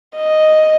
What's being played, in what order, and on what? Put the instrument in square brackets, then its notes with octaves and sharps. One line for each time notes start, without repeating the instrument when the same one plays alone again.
[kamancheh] D#5